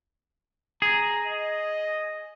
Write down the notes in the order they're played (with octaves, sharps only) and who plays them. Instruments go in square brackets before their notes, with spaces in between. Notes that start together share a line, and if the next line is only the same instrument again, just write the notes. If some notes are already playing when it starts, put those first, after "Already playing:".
[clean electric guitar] G#4 [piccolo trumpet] A#5
[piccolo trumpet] D#5